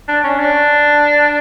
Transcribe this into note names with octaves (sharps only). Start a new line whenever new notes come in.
D4
C#4
D4